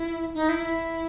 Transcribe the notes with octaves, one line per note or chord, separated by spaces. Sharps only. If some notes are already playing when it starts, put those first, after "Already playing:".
Already playing: E4
D#4
E4
E4